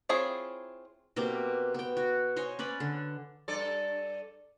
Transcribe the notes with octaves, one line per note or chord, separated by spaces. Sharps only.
C4 E4 F4 G#4 C#5
B2 A#3 C4 G4
B3 G5
F#4
C5 C#5 D#5 G#5
C#4 B4 D5 B5
D3
G2 A4 D5